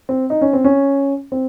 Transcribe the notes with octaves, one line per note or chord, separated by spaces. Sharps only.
C4
D#4
C#4
C4
C#4
C4